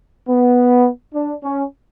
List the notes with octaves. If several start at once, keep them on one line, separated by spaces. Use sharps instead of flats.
B3
D4
C#4